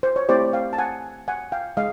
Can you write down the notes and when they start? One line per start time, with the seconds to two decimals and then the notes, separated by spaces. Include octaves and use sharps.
0.03 C5
0.16 C#5
0.29 A3 C4 E4 G4 C5 D5
0.53 F5 G5
0.73 A5
0.78 F#5 G#5
1.28 F#5 G#5
1.52 F5 G5
1.77 G#3 D#5 F5